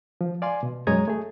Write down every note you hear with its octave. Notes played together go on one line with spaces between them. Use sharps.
F3
D5 F5 G#5 C6
B2
F#2 G#3 C#5 A#5 D#6 G#6
A3 G#4